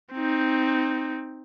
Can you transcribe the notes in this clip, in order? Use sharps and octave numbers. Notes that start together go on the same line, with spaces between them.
C4 D#4